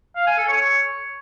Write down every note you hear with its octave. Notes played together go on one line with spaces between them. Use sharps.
F5
G#5
A4
C#5